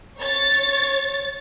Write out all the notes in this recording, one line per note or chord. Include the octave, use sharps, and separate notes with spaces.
C#5 A6